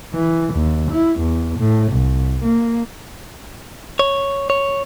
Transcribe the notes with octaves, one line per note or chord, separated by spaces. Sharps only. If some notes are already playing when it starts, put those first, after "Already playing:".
E3
D#2
E4
E2
A2
C2
A#3
C#5
C#5